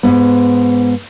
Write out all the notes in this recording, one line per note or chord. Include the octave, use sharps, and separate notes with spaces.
G#2 B3